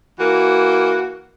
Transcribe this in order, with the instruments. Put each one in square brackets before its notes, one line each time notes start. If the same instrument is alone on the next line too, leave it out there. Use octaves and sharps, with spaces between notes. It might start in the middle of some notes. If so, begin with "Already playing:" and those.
[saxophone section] E3 A#3 F#4